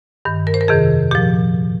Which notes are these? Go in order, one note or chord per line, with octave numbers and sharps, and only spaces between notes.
G2 D#3
A#4
C5
A#4
F2 C3 D#3 G#4
A#2 F3 G4